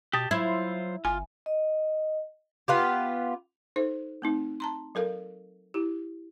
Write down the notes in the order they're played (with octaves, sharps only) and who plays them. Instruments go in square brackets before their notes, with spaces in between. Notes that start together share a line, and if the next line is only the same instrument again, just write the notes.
[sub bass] B2 [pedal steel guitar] G4 A5 [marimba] D#6
[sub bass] F#3 [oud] E4 [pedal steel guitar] F4 C5 [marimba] G#6
[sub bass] G1 [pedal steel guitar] F4 [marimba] G#5
[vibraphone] D#5
[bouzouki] B3 F4 G4
[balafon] D#4 A4 C5
A3 C4 D#4
A5 A#5 C6
F#3 A4 A#4 F5
E4 G4